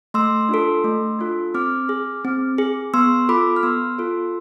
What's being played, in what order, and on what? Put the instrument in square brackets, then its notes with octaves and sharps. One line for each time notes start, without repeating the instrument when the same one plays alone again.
[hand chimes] A3 C6 E6
D4 F4 A4
A3
D4 F4 A4
C4 D6 F6
G#4
C4
G#4
B3 C6 E6
F4 A4 B5 D6
F6
B3 C6 E6
F4 A4